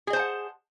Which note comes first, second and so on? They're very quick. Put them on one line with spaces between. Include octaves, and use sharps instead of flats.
G#4 D#5 C5 A5 F#5